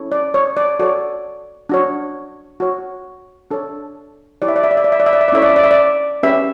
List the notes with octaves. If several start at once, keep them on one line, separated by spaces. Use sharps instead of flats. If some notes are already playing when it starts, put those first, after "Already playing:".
Already playing: C#4 E4 A4 C#5
D5
C#5
D5
F#4 A4 C#5 D5
D4 F#4 C#5
F#4 C#5
D4 A4 C#5
E4 G4 C#5 D5
E5
D5
E5
D5
E5
D5
E5
D5
E5
D5
E5
D5
C#4 E4 A4 C#5 E5
D5
E5
D5
E5
D5
C#4 G4 B4 E5